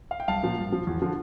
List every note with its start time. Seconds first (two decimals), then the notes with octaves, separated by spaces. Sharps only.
0.11 F5
0.20 G5
0.28 C2 F5 A5
0.43 A#2 F3
0.58 G2
0.72 F3
0.87 E2
1.02 D3 F3